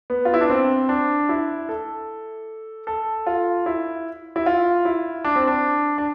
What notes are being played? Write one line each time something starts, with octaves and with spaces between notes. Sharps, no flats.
B3
F4
E4
D4
C4
D4
E4
A4
A4
F4
E4
E4
F4
E4
D4
C4
D4
D4